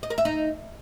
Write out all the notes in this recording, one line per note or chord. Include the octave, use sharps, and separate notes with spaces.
D#5
A#4
E5
D#4